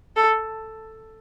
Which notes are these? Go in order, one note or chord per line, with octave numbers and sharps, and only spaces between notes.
A4